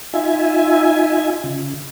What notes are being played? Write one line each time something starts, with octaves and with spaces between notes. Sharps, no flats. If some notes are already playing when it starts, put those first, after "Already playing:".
D#4 F4 E5 G#5
C#3